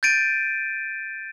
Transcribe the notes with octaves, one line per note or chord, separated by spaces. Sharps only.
G6 A6 D7 D#7